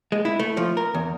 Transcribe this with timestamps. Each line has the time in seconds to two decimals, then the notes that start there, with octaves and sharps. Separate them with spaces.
0.12 G#3
0.25 E4
0.39 A3
0.57 F3
0.77 A#4
0.94 E2